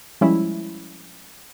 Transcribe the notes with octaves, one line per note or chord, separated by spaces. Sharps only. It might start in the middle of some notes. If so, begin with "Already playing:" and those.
F3 G3 G#3 C#4 E4